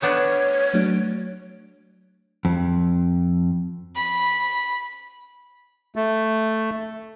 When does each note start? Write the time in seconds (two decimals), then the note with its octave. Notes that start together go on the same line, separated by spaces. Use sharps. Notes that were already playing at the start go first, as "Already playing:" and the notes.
0.02 A3 B3 D4 C#5
0.74 F#3 A3 D4
2.45 F2
3.95 B5
5.96 A3